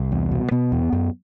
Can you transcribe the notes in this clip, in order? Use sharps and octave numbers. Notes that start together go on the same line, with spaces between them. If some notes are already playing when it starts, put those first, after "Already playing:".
Already playing: C2
E2
B2
B2 B3
E2
F#2